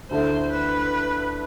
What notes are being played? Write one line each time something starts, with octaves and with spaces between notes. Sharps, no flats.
D2 D3 A3 E4 C5
B4